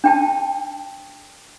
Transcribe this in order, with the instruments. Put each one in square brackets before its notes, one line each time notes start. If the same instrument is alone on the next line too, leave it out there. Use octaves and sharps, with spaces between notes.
[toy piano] D4 G5 A5